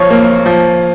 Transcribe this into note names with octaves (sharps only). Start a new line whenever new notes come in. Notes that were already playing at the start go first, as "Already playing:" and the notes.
Already playing: B1 F3 C#5
A#3
F3